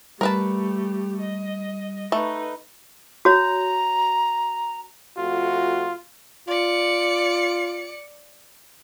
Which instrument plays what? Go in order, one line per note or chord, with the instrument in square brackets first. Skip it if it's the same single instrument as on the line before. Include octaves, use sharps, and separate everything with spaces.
[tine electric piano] G3 [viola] A3 G4 [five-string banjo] A#4 B4 A5
[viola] D#5
[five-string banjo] A3 [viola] D#4 B4
[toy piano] F#4 C#5 [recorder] A#5
[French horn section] F2 A3 F#4 [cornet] F4
[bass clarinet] F4 [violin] D5 C#7